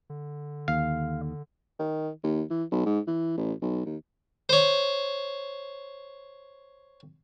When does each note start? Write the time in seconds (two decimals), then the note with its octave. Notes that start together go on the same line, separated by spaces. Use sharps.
0.10 D3
0.68 D#2 F5
1.79 D#3
2.23 D#2
2.50 E3
2.72 B1
2.86 G#2
3.07 E3
3.37 A1
3.62 B1
3.86 D#2
4.49 C5 C#5